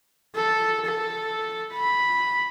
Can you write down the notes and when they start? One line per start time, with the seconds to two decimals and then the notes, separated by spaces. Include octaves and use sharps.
0.35 A4
0.85 A4
1.73 B5